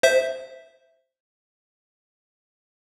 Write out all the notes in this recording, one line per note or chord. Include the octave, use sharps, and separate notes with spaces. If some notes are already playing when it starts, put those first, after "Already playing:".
C5 E5